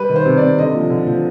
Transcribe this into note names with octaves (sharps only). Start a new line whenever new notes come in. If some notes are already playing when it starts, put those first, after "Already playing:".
Already playing: G3 B4
D#3
C5
C3
D5
C3
D3 D#5
F3
D3
F3